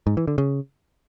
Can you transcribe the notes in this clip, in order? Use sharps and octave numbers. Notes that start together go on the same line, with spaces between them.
G#2
E3
D3
C#3